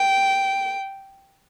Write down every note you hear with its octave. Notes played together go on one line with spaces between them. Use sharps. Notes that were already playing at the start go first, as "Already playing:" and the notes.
Already playing: G5